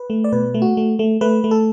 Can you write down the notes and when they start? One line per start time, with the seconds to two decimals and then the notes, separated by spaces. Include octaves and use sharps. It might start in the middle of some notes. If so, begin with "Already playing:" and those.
Already playing: B4
0.10 A3
0.24 D5
0.32 B2 B4
0.54 A3
0.62 F#4
0.77 A3
0.99 A3
1.21 A3 B4
1.44 A3
1.51 A4